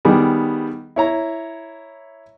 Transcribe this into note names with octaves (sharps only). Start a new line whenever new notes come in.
D#3 G3 B3 G#4
E4 C#5 A#5